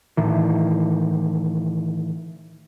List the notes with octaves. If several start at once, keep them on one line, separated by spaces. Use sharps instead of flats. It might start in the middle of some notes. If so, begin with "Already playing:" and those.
A2 D#3 E3